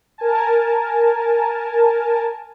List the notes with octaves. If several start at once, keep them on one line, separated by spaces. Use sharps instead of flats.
A#4 G#5 A5